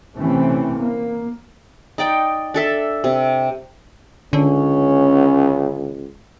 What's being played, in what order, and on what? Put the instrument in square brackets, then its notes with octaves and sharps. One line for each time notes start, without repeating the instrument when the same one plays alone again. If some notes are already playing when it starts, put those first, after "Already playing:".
[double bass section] C3 E3 A3 C4 C#4
A#3
[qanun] D#4 D5 G5
D4 A4 E5
C3
[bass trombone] C#2 [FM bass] D3 [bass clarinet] C#4